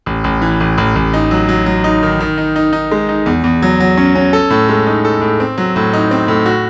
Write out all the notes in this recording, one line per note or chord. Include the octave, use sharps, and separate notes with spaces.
A1
A1
E3
A1
A1
A1
D#4
F#3
F#3
F#3
D#4
D#3
D#3
D#4
D#4
D#4
G#3
D#4
E2
E2
F#3
F#3
C#4
C#4
A4
A2
G#3
D#4
A4
A2
C4
F#3
A2
D#4
C4
A2
F#4